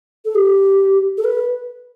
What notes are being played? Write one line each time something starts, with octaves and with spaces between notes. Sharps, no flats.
A4
G4
A4
B4